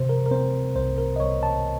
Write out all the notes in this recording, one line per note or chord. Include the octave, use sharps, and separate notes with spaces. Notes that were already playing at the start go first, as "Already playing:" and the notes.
Already playing: C3 C5
A#4
A#4
C4 C5
C2 C5
A#4
D#5
C2 C#5
A5